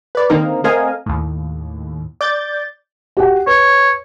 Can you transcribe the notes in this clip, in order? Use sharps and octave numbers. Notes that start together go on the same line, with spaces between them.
B4 D5
D3 D#3 A#3 C4 D#4 A#4
A3 C4 A#4 D#5 F5 G#5
D#2 A2
D5 G6 A6
F#4 G4 F#5
B4 C#5